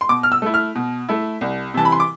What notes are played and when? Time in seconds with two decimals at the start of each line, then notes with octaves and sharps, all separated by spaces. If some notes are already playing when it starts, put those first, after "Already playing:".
0.01 C6
0.09 B2 D6
0.23 F6
0.32 E6
0.42 A3 E4
0.54 F6
0.75 B2
1.09 A3 E4
1.41 C2
1.74 C3 E3 A5
1.85 B5
1.92 C6
2.00 D6